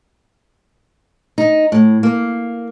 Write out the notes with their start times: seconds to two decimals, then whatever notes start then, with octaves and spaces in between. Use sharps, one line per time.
1.38 D#4
1.72 A2
2.03 A#3